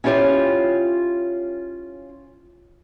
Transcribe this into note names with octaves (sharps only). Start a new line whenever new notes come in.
C#4 E4 F4 G4 C#5